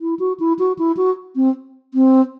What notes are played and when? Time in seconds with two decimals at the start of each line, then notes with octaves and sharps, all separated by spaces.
0.01 E4
0.19 F#4
0.40 E4
0.59 F#4
0.78 E4
0.97 F#4
1.36 C4
1.94 C4